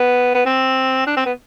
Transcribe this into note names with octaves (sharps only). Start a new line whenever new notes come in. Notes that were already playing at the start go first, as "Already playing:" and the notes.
Already playing: B3
B3
C4
D4
C4
B3